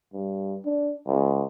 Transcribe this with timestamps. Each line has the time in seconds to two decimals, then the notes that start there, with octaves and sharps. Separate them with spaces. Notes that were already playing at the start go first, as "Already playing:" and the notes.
0.13 G2
0.65 D4
1.07 C#2